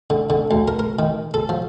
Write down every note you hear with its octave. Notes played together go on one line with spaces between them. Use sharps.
D3
D3
D2
A#4
A#4
D#3
A4
F3